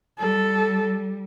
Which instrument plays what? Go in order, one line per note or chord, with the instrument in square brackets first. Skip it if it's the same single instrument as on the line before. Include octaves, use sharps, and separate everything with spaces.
[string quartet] G3 [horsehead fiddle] A4